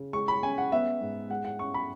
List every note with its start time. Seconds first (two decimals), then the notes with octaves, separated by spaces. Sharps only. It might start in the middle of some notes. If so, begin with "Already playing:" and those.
Already playing: C#3
0.13 G#3 C#6
0.28 B5
0.43 C#4 G#5
0.58 F#5
0.72 B3 E5
1.01 G#2
1.30 G#3 F#5
1.45 F#5
1.59 C#4 C#6
1.74 B5